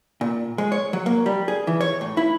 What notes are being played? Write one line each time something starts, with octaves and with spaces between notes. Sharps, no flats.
A#2
G#3
C#5
F#3
A#3
G3
G#4
E3
C#5
A2
E4